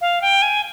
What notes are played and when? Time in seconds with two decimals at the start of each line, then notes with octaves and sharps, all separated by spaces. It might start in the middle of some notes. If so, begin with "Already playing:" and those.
0.01 F5
0.22 G5
0.42 G#5